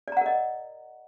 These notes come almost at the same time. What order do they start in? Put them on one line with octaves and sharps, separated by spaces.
D5 A#5 F#5 A#4 D#5